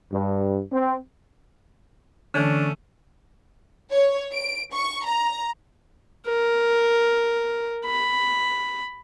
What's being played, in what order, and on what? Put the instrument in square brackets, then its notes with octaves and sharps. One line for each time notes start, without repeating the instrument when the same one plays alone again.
[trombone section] G2
C4
[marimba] D3 E3 [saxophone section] A3 C#4 [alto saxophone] D4
[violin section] C#5
D7
C#6
A#5
[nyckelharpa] A#4
B5